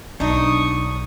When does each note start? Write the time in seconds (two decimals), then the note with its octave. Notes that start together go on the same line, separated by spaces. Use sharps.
0.20 B1 D4 D#4 C#6 D#6